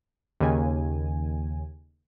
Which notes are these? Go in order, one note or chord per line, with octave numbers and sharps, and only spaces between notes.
D#2 C#3 G#5